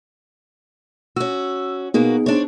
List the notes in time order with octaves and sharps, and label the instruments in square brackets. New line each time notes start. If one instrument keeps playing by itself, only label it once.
[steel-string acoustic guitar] C#4 F#4 [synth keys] E6
[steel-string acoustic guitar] B2 A#3 F#4 [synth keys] B3 D#4 G#4
[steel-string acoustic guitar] C4 D4 C#5